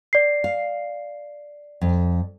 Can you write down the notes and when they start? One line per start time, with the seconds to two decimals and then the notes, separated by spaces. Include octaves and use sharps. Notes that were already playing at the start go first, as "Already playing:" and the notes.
0.13 D5 C7
0.44 F5
1.81 F2